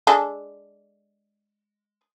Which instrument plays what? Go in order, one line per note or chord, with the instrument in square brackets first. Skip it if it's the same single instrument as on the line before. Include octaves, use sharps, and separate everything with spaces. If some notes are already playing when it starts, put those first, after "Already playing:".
[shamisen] G#3 D4 A4